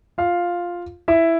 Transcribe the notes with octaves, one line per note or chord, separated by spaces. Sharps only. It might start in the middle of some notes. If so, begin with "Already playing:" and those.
F4 F5
E4 E5